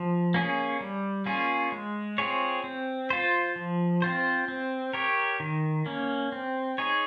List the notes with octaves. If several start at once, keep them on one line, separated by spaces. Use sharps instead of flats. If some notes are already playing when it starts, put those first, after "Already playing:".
Already playing: F3
A#3 C#4 G#4
G3
A#3 C#4 F4 G#4
G#3
C4 F4 G#4 C#5
C4
F4 C5
F3
C4 F4 C5
C4
G4 A#4 C#5
D#3
A#3 C#4
C4
D#4 G#4 C#5